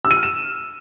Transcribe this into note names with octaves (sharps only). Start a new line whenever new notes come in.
E6
D#7
F6
E7